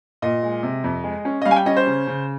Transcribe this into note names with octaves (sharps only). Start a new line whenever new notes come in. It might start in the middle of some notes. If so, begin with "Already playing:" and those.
A#2 D#5
G#3
C3
F2
G#3
C#4
D#5
G3 F5
G#5
G5
C#4 D#5
C5
C#3
C#3